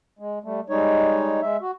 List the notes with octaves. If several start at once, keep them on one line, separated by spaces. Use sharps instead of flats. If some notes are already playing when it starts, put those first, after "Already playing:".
G#3
G3 A3
G3 G#3 D#4 C#5
G#3 E5
F#4